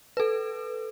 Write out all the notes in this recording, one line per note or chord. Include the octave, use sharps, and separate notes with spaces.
A4 B4